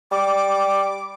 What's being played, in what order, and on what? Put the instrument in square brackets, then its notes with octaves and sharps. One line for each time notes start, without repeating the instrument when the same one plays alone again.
[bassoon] G3 [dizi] D6